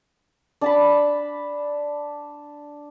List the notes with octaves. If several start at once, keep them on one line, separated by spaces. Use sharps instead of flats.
D4 A5 B5